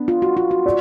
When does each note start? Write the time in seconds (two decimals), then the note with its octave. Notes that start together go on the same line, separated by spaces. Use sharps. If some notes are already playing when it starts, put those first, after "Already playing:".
Already playing: B3 D4
0.08 F4
0.22 F#4
0.37 F4
0.51 F#4
0.66 D5